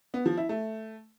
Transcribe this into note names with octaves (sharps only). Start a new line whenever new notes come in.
B3
F3
E4
A3